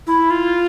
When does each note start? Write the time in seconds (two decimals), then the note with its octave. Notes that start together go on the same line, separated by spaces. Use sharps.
0.07 E4
0.30 F4